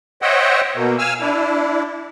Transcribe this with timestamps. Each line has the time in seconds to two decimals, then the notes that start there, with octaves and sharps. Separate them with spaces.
0.22 C5 C#5 D#5 E5 F#5 G5
0.76 B2 A#3
0.98 F5 G#5 E6 F6
1.21 D4 E4